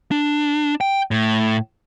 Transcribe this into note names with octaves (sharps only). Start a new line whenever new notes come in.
D4
G5
A2